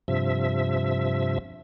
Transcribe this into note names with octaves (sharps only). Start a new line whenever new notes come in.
G2 C3 F3 E5